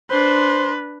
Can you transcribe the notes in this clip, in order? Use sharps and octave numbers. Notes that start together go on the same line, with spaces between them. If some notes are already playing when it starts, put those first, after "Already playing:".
D4 B4 C5